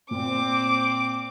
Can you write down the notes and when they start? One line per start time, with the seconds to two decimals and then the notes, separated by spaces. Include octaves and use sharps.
0.11 A#2 C4 D6